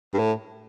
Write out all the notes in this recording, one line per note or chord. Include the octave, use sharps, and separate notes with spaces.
G2
A2